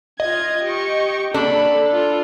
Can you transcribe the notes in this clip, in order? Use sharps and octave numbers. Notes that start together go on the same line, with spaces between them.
F4 D#5 G#6
G4 C#6
A#3 D4 A4 B5
F4